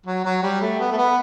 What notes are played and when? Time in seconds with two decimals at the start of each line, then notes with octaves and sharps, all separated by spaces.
0.06 F#3
0.25 F#3
0.43 G3
0.61 A3
0.79 B3
0.92 A3
0.98 B3